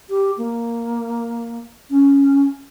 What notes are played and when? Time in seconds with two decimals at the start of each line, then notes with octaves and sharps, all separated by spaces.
0.10 G4
0.38 A#3
1.90 C#4